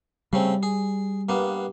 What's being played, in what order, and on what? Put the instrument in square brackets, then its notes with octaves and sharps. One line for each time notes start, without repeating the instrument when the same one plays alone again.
[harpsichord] C#3 A3 C4 [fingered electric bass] G3
[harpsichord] G#4
G2 A#3 B3